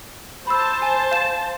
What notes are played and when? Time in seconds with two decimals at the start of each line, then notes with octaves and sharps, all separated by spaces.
0.47 C5 A5 B5 E6
0.82 G#5
1.11 F5 E7